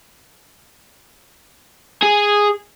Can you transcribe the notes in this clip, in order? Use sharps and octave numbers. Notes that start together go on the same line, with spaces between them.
G#4